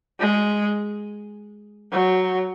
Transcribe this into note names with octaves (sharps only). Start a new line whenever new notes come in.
G#3
F#3